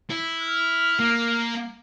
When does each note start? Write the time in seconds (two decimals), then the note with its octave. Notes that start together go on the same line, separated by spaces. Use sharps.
0.10 E4
0.42 F6
1.00 A#3